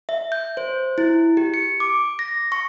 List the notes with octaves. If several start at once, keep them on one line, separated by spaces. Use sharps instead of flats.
E5
G6
C5
E4
G4
C#7
D6
A#6
C#6